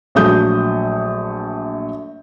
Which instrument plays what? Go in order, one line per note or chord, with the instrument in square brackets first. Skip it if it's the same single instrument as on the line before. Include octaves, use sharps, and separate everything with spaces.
[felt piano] A#1 F#3 A3 D#6 G6